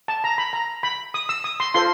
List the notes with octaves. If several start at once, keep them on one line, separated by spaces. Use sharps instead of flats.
A5
A#5
B5
A#5
B5
D#6
E6
D#6
C6
F4 A4 C5 C6